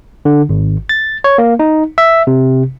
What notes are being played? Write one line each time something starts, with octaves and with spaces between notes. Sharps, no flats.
D3
G#1
A6
C#5
A#3
D#4
E5
C3